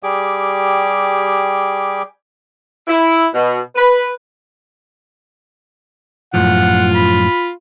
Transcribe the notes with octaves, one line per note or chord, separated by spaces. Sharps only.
G3 G4 G#4 D6
E4
B2
B4
F#2 A2 F3 F4 F#5
B5